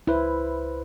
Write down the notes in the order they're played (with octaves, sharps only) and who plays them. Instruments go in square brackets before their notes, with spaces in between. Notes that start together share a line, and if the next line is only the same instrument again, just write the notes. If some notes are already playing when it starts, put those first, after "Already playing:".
[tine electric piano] C#2 B4 C5 [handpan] E4